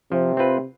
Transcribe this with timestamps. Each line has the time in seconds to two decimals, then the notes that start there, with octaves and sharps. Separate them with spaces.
0.12 C3 F3
0.37 C4 F4 B4